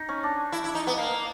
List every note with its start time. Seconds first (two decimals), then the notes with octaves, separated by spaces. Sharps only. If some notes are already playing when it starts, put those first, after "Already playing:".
Already playing: D#4
0.09 C#4
0.23 D4
0.52 E4
0.64 E4
0.75 D#4
0.87 B3
0.98 A#3